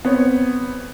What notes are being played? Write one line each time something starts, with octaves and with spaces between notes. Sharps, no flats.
B3 C4 C#5